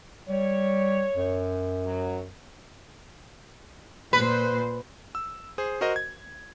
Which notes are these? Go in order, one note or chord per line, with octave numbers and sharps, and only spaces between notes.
G3 C#5
F#2
F#3
A#2 B4 C5
E6
G#4 C5
F#4 A#4 C5 D#5
G#6